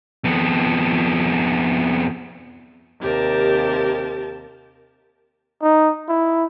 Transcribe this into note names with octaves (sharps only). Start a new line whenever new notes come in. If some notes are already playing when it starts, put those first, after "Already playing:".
F2 B3
D#2 C3 G4 A#4 A5
D#4
E4